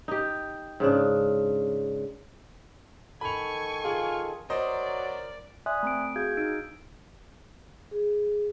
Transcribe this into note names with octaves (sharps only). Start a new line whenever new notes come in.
D#4 G4
G#2 C#3 D4
D#3 A4 G#5 B5 C#6 F7
F4 G#4
F#3 A#4 C5 D5 D#5
D5 E5 G#5 C6 D#6 F#6
A3 C4 D7
F#4 G#4 F5 G6 G#6
D#4 E6 F6 D7
G#4